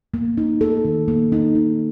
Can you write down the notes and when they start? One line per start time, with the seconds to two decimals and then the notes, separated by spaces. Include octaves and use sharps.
0.14 A#3
0.37 D#4
0.61 A4
0.85 D#3
1.08 A#3
1.32 D#4
1.55 D#4